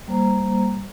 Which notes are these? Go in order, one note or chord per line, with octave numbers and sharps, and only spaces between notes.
G3 A#3 C5 A#5